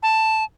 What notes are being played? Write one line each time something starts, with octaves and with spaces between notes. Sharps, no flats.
A5